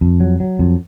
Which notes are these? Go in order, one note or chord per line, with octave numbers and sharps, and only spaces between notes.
F2
F#3
F#3
F2